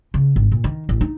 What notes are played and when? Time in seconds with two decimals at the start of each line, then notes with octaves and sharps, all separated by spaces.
0.14 C#3
0.36 G#1
0.52 A#2
0.64 D#3
0.89 A1
1.01 D#4